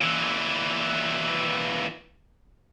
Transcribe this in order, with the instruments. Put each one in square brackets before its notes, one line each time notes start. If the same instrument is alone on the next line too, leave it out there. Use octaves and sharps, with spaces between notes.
[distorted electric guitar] A#2 E3